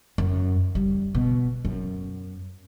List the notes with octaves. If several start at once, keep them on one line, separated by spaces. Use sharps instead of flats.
F#2
G3
B2
F#2